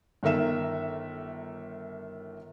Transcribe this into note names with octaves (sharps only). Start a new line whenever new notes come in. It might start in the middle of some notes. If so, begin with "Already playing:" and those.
G1 D#3 A4 A#4 E5 E7